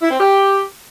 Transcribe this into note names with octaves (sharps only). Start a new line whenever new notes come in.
E4
C4
G4